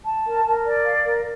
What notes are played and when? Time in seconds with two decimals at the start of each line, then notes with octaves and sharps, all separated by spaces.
0.04 A5
0.25 A#4
0.44 A#4
0.64 D5
0.85 F5
1.05 A#4